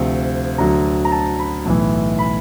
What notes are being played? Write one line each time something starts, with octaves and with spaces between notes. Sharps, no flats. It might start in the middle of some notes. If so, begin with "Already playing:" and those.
Already playing: D2 C3 F3
D2 D3 F#3 A#5
A#5
A5
B5
B1 A2 E3
B5